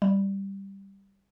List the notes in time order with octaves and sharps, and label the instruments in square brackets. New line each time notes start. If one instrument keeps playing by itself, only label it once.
[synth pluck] G3